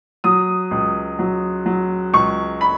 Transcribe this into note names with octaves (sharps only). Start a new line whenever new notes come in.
F#3 D#6
C#2
F#3
F#3
C#2 C#6
B5